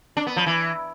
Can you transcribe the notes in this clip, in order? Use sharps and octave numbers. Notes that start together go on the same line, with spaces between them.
D4
B3
F3
E3